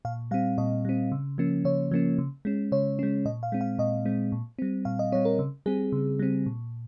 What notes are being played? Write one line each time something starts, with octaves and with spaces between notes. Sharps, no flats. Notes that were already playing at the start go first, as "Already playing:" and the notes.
A#2 F5
G3 C4 F5
A#2 D#5
G3 C4
C#3
F3 A#3 C#4
C#3 C#5
F3 A#3 C#4
C#3
G#3 C#4
C#3 C#5
G#3 C#4
A#2 D#5
F5
G#3 C4
F5
A#2 D#5
G#3 C4
A#2
G3 C4
A#2 F5
D#5
G3 C4 C#5
A#4
C#3
G3 C4 G#4
C#3
G3 C4
A#2